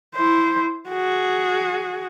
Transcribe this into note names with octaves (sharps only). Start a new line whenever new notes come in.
E4 C5
F#4 G#4